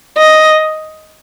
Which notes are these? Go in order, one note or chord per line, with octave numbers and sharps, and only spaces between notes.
D#5